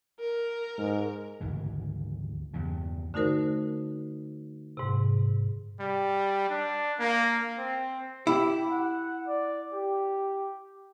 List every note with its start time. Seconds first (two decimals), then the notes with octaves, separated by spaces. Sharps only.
0.20 A#4
0.78 G#2
1.41 G#1 D2 C#3 E3
2.54 E2 G2 C#3
3.14 D3 A3 D#4 F#4 A#4 C5
4.77 G#2 C3
5.80 G3
6.49 D4
6.99 A#3
7.58 C4
8.27 E4 G4
8.70 F#5
9.27 D5
9.73 G4